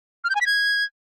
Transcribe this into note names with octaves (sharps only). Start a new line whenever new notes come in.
F6
G6
G#5
B6
G#6